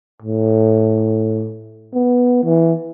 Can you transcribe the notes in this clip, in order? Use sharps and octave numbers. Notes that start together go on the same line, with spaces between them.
A2
B3
E3